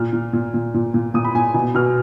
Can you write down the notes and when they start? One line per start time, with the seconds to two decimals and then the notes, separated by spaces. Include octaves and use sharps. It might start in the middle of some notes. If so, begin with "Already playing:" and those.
Already playing: A#2 F6
0.13 A#2
0.33 A#2
0.54 A#2
0.74 A#2
0.94 A#2
1.14 A#2 D#6
1.24 B5
1.34 A#2 G#5
1.54 B2 G#5
1.75 B2 F6